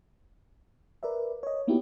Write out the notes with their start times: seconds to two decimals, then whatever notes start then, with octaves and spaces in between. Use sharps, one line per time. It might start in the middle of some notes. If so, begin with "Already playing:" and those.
1.03 A#4 B4 D5 E5
1.43 C#5 D#5
1.67 A#3 B3 D#4 E4 F#4 G4